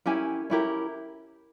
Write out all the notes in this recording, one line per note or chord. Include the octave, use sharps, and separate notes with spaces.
C#4 E4 G4 A#4 G#5
C#4 E4 G4 A#4